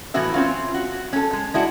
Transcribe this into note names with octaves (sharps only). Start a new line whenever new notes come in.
A2 E3 B3 E4 F#4 E5
C4 C#4 F4
F#4
C#4 A4
G#3
G#3 D4 E4 F#4